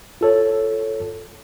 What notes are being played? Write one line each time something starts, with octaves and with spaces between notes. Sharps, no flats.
F4 A4 C#5